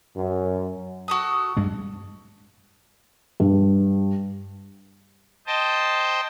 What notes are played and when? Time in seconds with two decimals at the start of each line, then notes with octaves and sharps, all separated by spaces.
0.15 F#2
1.08 F#4 A4 D#6
1.57 G2 G#3
3.40 G2
5.47 C5 D#5 G5 A5